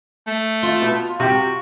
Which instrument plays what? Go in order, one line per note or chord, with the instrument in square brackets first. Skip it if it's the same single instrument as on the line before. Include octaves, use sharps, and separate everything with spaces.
[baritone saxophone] A3
[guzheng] F4
[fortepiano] B2
[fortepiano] C3 G4 [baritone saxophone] F#4